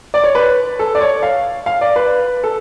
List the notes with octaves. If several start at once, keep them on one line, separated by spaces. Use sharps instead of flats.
D5
C#5
B4
A4
D5
C#5
F5
F5
D5
B4
A4